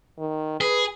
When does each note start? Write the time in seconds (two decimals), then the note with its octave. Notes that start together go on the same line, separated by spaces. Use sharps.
0.19 D#3
0.61 G#4 B4